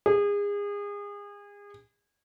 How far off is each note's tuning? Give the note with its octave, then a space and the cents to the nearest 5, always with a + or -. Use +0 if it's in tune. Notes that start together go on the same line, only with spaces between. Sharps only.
G#4 -30